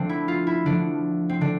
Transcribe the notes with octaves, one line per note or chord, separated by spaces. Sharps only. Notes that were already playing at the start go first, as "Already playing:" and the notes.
Already playing: D3 F3 A3 C4 D4
E4
F4
E4
D3 F3 A3 D4
C4
D3 D4